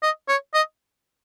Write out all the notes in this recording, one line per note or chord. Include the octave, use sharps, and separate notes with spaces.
D#5
C#5
D#5